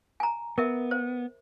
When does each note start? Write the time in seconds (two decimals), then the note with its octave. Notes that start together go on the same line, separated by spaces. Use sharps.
0.20 G#5 A#5
0.58 B3 A#4 E5
0.91 C5